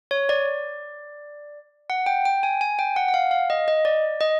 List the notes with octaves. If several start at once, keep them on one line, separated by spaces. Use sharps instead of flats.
C#5
D5
F#5
G5
G5
G#5
G#5
G5
F#5
F#5
F5
F5
D#5
D#5
D5
D#5